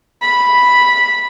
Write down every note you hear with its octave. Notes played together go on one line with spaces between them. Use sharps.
B5